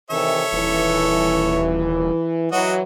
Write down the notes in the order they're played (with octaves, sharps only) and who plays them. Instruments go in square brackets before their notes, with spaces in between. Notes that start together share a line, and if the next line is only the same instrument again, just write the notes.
[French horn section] C3 D#3 E3 [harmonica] A4 C#5 E5
[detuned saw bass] D#1 [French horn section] E3
[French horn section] E3 F#3 [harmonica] F#4 D#5